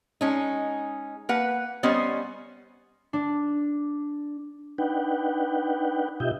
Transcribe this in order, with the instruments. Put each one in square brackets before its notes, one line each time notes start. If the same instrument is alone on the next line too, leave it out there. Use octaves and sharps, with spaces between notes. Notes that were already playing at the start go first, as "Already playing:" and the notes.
[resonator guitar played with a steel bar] G#3 C#4 D#4
A#3 B4 F#5
G3 B3 C#4 C5 C#5 D#5
[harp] D4
[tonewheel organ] D4 D#4 B4 F#5 G5
B2 F4 G4 D#5 E5 G6